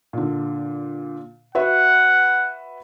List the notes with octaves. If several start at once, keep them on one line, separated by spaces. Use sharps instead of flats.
A#2 D3
F#4 B4 E5 F#5